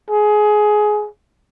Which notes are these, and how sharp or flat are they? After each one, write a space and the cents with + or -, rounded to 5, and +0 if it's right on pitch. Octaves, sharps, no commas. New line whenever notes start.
G#4 +20